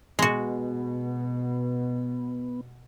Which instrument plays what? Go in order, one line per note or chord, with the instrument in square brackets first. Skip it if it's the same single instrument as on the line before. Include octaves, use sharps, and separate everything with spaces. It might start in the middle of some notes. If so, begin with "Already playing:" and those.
[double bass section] B2 [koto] G#3 F#4 [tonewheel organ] B3